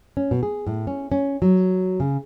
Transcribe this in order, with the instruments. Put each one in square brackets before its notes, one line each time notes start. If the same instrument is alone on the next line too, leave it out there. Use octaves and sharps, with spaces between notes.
[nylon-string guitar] C#4
B2
G#4
A2
C#4
C#4
F#3
C#3